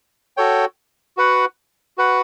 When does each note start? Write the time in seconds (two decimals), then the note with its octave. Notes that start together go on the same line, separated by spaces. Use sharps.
0.37 F#4 A4 C#5 G5
1.17 F#4 B4 F#5
1.98 F#4 B4 F#5